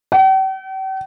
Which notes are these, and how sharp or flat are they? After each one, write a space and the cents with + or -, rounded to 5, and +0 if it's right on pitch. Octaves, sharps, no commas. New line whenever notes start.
G5 -45